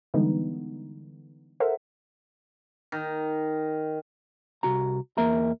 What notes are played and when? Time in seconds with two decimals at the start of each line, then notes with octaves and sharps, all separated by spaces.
0.14 D3 E3 G3 G#3 B3 D#4
1.60 A4 A#4 C5 E5 F#5
2.92 D#3
4.63 C2 F#4 A#5
5.17 E2 A#3 A#4 E5 A#5